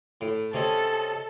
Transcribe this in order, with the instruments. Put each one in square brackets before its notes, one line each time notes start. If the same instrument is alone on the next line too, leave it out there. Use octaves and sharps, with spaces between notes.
[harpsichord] A2
[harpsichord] C3 C#4 D#5 [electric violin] A4